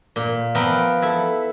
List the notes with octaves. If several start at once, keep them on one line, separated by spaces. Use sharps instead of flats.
A#2
F3 B3 A#4 E5 G5
E4 A4 E5